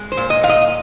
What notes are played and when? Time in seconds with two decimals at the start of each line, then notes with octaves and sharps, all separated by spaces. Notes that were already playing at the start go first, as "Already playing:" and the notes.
Already playing: G#3
0.12 C5
0.17 A#2
0.30 D#5
0.43 A#2 F5
0.49 D#5